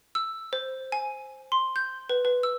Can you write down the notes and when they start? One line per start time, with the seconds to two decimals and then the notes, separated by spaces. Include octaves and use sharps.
0.15 E6
0.53 C5
0.92 G#5
1.52 C6
1.76 G6
2.10 B4
2.25 B4
2.43 E6